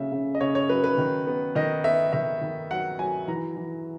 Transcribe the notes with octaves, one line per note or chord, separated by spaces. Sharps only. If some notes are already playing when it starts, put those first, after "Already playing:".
Already playing: C#3 F#3 A#3 E5
C#3
D#5
C#3 C#5
C#5
F#3 B4
B4
D#3
B3
D#3 D#5
B3 E5
D#3 E5
D#3
F#3 F#5
F#3 G#5
E3 A#5
E3